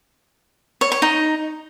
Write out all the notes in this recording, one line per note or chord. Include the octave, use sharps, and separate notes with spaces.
C#5
C#5
D#4